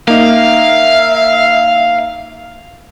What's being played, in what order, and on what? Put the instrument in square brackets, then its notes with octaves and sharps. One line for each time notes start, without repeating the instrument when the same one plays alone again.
[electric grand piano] A#3 D#4 [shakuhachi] E5 [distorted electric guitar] F5